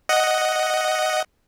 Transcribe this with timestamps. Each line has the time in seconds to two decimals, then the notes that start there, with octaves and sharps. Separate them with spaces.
0.09 D#5 F#5